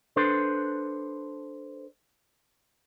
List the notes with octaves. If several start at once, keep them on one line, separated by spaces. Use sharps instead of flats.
D4 A4 B4 C5